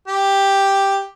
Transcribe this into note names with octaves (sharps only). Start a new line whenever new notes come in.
G4